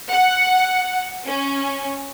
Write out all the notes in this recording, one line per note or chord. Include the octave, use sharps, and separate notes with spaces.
F#5
C#4